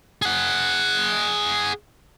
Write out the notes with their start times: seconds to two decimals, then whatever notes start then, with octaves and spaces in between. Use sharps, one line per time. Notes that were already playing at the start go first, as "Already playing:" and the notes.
0.22 G#4 F#5